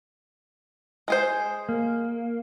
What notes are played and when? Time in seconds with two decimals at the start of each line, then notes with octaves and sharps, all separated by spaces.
1.08 G#3 G#4 C5
1.69 A#3